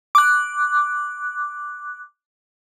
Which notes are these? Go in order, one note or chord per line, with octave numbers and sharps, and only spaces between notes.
D6 F#6